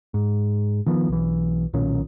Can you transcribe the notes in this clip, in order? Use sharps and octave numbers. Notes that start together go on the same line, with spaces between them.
G#2
D#3 F3 B3
B1 E3
B1 A#2 D#3 C#4